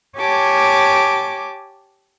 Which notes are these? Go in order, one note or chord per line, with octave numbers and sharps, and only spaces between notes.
G4 C#5 G#5 A5 D6